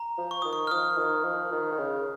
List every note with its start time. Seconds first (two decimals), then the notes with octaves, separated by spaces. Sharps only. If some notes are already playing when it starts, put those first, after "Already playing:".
Already playing: A#5
0.18 F3
0.31 C#6
0.42 D#3 D#6
0.53 C#6
0.67 F6
0.71 F3 D#6
0.97 D#3
1.24 F3
1.52 D#3
1.72 D#3
1.78 C#3